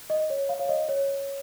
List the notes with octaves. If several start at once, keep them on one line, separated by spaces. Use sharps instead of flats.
D#5
C#5
F5
C#5
D#5
C#5